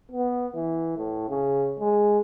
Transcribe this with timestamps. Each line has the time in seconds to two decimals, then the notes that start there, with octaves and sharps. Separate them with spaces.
0.12 B3
0.55 E3
0.97 A2
1.29 C#3
1.80 G#3